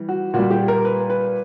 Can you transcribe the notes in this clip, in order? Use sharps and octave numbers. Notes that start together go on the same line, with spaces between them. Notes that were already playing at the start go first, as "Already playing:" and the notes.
Already playing: E3 G3
F#4
A#2 G3 F#4
G4
A#4
B4
B4